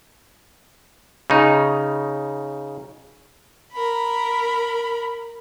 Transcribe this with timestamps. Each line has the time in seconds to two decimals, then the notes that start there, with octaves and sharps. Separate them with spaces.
1.30 C#3 D#4
3.73 A#4 B5